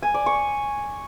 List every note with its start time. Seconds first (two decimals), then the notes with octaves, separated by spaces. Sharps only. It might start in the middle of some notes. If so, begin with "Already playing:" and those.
0.03 G#5
0.14 D5
0.26 C#6